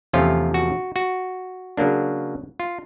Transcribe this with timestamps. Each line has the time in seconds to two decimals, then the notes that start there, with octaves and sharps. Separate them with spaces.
0.13 E2 C3 F3 A3 C#4 F4
0.54 F#4
0.96 F#4
1.77 C#3 F#3 A#3 D4
2.60 F4